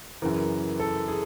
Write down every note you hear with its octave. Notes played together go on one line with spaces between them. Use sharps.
F#2 C#3 E3 A#4
A4
G#4